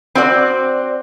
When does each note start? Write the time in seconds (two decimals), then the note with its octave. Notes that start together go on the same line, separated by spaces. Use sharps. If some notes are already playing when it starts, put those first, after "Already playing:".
0.15 C4 F#4 D5